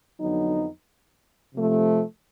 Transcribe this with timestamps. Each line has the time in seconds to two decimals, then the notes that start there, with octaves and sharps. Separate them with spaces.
0.19 F2 D3 F#3 B3 D#4
1.53 C3 F3 A3